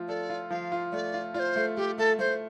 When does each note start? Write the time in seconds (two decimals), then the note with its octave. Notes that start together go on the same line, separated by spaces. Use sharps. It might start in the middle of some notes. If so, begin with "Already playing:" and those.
Already playing: F3 A3 F4
0.08 A4 D5
0.30 F4
0.50 F3 F5
0.72 F4
0.92 A3 D5
1.14 F4
1.34 F4 D5
1.39 C5
1.56 A3
1.77 A3 G4
1.98 A3 A4
2.19 A3 C5